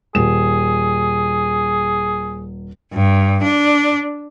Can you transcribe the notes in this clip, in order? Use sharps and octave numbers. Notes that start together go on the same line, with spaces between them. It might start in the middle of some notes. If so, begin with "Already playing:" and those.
D#1 G#4 E7
G2
D4